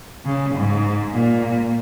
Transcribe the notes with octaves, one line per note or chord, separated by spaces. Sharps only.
C#3
G#2
A#2